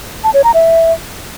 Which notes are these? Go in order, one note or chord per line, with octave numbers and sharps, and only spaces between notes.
A5
C#5
A#5
E5